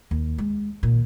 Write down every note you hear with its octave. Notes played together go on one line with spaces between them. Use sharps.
D#2
G#3
A#2 D#3